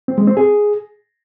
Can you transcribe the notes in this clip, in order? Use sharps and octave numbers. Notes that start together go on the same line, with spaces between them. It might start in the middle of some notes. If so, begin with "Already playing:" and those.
C4
G#3
C4
G#4